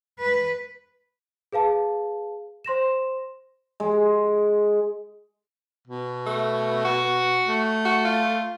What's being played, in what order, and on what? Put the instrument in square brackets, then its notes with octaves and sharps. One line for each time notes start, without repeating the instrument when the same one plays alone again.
[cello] B4
[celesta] G#4 B4 F5 A5
C5 C6 A#6 E7
[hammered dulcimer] G#3
[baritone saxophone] B2
[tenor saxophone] A3
F#4
[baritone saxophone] A3
[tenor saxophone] F#4
F4